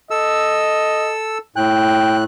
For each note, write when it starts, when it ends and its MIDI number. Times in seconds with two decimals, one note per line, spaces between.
0.11 1.38 69
0.11 1.13 75
0.11 1.38 88
1.56 2.24 45
1.56 2.21 79
1.56 2.24 90